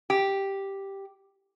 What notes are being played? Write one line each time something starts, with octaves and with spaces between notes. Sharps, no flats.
G4